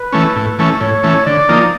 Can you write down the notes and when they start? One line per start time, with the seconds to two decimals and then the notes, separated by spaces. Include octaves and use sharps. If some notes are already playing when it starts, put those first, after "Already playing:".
Already playing: B4
0.13 E3 A3 C#4
0.36 A2
0.59 E3 A3 C#4
0.80 A2 C#5
1.03 E3 A3 C#4
1.26 D3 D5
1.49 F3 A#3 D#4